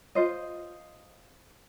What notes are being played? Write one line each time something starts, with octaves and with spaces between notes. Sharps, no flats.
F4 C5 D#5